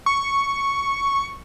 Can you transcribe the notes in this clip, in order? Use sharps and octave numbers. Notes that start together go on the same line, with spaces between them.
C#6